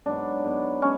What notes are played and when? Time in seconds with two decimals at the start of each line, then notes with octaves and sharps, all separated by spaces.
0.06 G#2 F#3 B3 D4
0.44 G#2 F#3 B3
0.82 G#3 C#4